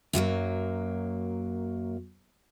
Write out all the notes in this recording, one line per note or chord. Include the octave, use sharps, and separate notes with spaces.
F#2 F#3 A3 A#3